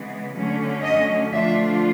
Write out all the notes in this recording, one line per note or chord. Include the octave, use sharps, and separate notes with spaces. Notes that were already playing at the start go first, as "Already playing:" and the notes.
Already playing: C#3 E3 G#3 B3
D3 F#3 A3 C#4
D#5
D3 F3 A3 D4 F4 E5